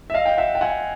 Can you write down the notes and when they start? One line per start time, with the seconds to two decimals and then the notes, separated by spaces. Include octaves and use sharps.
0.10 E5
0.14 D#5 F5
0.26 G5
0.38 E5 F#5
0.55 G5
0.61 F#5 G#5